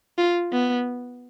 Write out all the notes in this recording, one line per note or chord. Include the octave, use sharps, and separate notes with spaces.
F4
B3